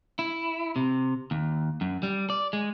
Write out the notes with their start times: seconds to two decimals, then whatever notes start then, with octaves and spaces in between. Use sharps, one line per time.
0.19 E4
0.76 C3
1.31 D#2
1.81 F#2
2.03 G3
2.30 D5
2.53 G#3